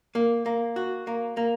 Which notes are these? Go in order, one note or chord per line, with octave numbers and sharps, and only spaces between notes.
A#3
A#3
F#4
A#3
A#3